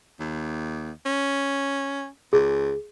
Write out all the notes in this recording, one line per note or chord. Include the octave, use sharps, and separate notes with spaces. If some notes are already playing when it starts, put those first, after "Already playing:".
D#2
C#4
C#2 G#4